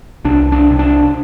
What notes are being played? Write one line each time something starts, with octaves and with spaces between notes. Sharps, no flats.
C2 D4
D4
C3
D4